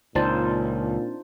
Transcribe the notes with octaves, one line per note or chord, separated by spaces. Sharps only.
C#2 A#2 C4 D4 D#4 F4 C5 A5